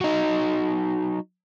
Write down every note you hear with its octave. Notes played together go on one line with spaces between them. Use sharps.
F#3 D#4